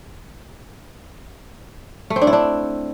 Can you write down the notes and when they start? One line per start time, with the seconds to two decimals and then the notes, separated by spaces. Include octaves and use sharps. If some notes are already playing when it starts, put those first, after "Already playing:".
2.10 A3
2.16 C4
2.22 D4
2.27 E4
2.33 D4